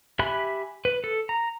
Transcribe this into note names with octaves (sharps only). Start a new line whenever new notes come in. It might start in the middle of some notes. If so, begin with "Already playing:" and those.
G4 E5 G#5 B5 F#6
B4
A4
A#5